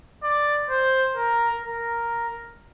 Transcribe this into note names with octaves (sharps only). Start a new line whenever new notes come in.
D5
C5
A#4
A#4